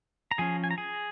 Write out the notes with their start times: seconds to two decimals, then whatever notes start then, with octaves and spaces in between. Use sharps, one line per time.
0.31 A#5
0.38 F3 C#4 G#4 G#5
0.64 G#5
0.71 A#5
0.78 G#4 G#5